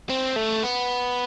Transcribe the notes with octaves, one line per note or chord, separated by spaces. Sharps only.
C4
A3
B3